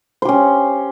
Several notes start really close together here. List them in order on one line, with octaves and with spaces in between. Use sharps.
C5 G4 C#4